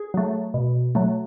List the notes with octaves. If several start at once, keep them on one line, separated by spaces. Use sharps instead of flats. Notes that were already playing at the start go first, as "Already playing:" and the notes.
Already playing: G#4
F#3 A3
B2
F#3 A3